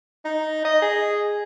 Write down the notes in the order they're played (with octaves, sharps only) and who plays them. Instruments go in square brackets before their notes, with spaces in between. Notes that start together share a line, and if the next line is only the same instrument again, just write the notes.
[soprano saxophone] D#4
D#5
G#4